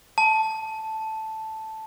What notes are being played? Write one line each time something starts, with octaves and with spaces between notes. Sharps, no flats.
A5